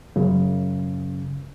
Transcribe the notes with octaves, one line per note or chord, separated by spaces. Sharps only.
F#2 C#3